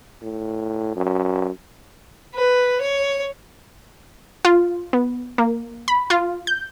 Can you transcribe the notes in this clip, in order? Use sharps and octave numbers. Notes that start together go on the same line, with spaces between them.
A2
F#2
B4
C#5
F4
B3
A#3
B5
F4
G6